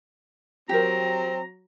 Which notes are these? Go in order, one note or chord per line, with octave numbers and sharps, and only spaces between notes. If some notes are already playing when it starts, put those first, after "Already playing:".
F#3 C4 G4 A#4 A#5